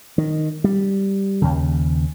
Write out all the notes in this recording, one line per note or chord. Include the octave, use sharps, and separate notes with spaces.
D#3
G3
D#2 C#3